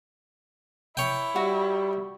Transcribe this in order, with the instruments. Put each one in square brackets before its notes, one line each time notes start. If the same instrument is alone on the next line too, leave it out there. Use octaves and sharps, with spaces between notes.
[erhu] E4 [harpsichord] C#5 G5
[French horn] G3 [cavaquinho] F#4